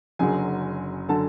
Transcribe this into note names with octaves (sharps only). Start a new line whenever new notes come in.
F#1 F#2 D3 F#3 G#4 G#5
D3 F#3 A4 A5